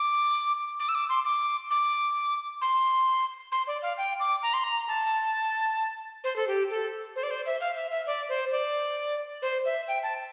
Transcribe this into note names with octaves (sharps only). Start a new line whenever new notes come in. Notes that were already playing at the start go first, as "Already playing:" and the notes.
Already playing: D6
D6
E6
D6
C6
D6
D6
C6
C6
D5
F5
G5
D6
A#5
C6
A#5
A5
C5
A4
G4
A4
C5
D5
C5
E5
F5
E5
E5
D5
C5
D5
C5
E5
G5
A5